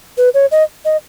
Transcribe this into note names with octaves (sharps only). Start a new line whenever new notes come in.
B4
C#5
D#5
D#5